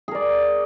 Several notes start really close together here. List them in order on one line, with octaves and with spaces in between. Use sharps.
G#4 A#4 D5